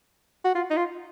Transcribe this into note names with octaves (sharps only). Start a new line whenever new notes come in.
F#4
F4
D#4
F4